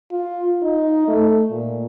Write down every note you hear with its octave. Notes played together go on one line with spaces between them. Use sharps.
F4
D#4
A3
A#2